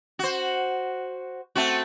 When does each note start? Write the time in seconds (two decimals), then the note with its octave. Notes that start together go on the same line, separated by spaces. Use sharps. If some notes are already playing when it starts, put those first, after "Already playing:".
0.19 F#4 C5
1.55 A3 C4 F#4